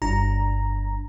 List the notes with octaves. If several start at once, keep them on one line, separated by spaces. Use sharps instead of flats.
G1 G2 D4 A#5